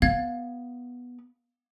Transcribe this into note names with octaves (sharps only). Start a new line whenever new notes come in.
B3 F5 G#6 A6